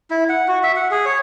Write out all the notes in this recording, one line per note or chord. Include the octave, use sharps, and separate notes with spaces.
E4
F#5
F#4
E5
F#5
G#4
C#5